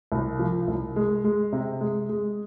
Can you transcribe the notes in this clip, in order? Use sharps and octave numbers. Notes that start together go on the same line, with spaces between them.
C2
F3
C2
G#3
G#3
C3
G#3
G#3